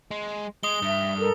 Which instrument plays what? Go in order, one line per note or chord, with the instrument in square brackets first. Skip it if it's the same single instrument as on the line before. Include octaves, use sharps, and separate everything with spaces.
[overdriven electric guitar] G#3
[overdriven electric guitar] G#3 [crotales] D#6 G7
[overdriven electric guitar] G2 [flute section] E5
[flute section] A4 A#4